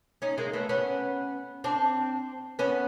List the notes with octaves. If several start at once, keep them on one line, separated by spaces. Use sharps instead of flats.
C#4 D#4
G#3 A#3
A3 B3
B3 C#4
C4 D4
B3 C#4